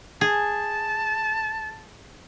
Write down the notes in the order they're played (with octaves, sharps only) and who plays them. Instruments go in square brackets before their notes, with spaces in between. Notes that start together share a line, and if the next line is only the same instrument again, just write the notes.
[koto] G#4 [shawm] A5